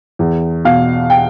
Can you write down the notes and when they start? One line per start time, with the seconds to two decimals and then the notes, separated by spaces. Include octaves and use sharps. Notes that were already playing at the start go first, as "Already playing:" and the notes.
0.19 E2
0.64 B2 F5
1.10 G5